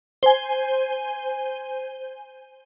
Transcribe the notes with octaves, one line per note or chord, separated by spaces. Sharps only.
C5 G#5